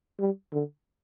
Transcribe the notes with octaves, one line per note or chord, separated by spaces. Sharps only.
G3
D3